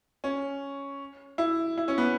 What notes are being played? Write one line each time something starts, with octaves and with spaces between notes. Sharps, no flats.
C#4
E4
E4
C#4
B3